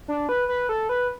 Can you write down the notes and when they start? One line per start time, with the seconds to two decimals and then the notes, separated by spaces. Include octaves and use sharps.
0.08 D4
0.29 B4
0.49 B4
0.69 A4
0.89 B4